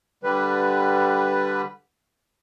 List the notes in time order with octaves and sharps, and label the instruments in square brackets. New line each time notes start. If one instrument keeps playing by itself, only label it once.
[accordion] D3 G3 B4